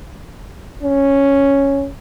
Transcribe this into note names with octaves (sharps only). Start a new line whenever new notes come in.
C#4